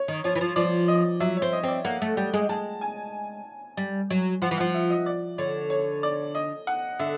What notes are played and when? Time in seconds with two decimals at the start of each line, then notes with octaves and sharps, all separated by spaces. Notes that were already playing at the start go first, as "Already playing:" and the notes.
Already playing: C#5
0.08 D#3
0.24 F3 C#5
0.35 E3
0.41 F3
0.56 F3 D5
0.88 D#5
1.20 F#3 E5
1.37 C4 C#5
1.53 D#5
1.63 C4 D5
1.85 A#3 F#5
2.02 A3
2.17 G3 G5
2.34 G#3
2.49 G#3 A5
2.81 G#5
3.77 G3
4.11 F#3
4.42 F3 F#5
4.51 E3
4.58 F3 F#5
4.74 E5
4.90 D#5
5.06 D5
5.38 D3 C#5
5.70 C#5
6.03 D5
6.35 D#5
6.67 F#5
6.99 D3 E5